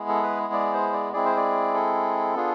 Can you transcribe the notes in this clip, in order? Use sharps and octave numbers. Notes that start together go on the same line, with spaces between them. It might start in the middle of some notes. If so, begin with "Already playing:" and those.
Already playing: G#3 B3 E4 G#4
A4
B4
D5
C5
D5
G#3 C4 E4 G#4 D5
C5
D5
A4
B3 D4 F4 G#4